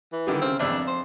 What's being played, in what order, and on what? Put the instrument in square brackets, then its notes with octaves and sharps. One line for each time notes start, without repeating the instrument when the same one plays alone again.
[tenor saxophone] E3
[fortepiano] D3 D#3 G3
[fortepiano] C#3 [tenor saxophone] C4
[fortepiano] G#1 E2 E6 [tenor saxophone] D4
[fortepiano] F2
[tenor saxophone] C5